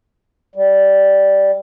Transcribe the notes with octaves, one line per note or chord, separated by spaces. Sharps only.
G3